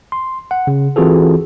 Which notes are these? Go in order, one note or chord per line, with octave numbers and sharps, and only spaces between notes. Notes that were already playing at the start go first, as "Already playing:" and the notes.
C6
F#5
C#3
E3 C4 F4 F#4 G#4 A4